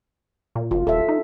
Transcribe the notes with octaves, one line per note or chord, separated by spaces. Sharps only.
A#2
F#1 F4
D#1 A4 E5
D#4